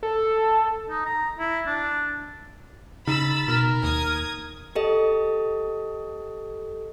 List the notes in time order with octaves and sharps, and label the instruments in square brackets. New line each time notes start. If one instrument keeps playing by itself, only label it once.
[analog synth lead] A4
[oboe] D#4
A#5
E4
D4
[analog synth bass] C#3 [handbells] D#4 [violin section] B5 E6 A6
[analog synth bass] B2 [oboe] A#4
[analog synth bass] D#2 [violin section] D#6 G#6
[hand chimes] G4 A4 D#5